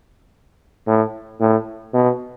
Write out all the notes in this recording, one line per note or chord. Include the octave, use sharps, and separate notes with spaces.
A2
A2
B2